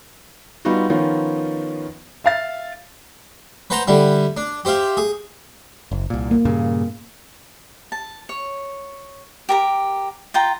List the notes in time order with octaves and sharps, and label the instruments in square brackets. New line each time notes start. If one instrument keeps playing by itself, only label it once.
[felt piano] G3 B3 D#4 F4 F#4
D#3 F3 B3 C#4 D#4 F4
E5 F5 A6
[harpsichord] B4 C5 F#5 A5 A#5 C6
D3 G3 E4
D4
G4 C5 E5 F5
G#4
[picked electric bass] F#1
C2 A#2
[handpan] A#3
[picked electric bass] G2 A#2 C#3
[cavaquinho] A5
C#5
G4 A#4 A#5
F4 G5 A#5